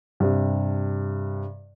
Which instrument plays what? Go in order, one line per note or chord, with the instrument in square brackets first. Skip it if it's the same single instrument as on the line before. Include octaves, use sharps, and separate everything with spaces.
[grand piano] G2 C3